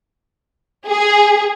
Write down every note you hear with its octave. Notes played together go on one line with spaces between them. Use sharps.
G#4